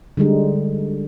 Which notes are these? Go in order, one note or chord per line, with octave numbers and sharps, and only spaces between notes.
D3 G3 G#3 D#4